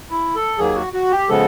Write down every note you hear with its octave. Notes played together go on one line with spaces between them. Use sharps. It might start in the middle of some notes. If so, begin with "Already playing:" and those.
E4
A4
D#2 D#3 F#3 A#3 G#4
F#4
F#4
G4
C#3 F3 G#3 B3 A4